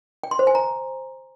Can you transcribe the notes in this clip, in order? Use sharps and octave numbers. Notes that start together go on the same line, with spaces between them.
G5
C6
C5
G#5
A#5